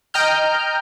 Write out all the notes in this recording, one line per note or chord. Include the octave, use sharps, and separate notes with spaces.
D#5 G5 A#5 F6 G6